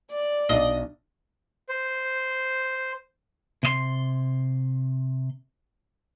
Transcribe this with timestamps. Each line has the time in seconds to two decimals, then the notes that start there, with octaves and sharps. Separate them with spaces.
0.10 D5
0.49 B1 D4 D#5
1.69 C5
3.63 C3 D#5 C6